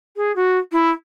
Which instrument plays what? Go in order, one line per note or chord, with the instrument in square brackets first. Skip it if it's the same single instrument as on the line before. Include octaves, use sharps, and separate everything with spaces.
[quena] G#4
F#4
E4